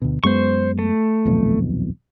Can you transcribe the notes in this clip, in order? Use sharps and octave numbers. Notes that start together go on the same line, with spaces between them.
D2 B2
F#2 G#3 B3 C5 C#6
A3
D#1 B1 F2